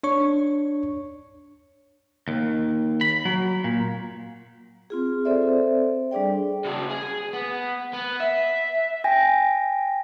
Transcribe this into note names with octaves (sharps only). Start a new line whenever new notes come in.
D4 C#5 C#6
D#2
B5
F#3
A#2
C4 F4 G#4
C4 A4 C5 D5 E5
G3 D4 G#4 D5 G5
C#3 F#4
G#4
B3
B3
E5
G5 G#5 A#6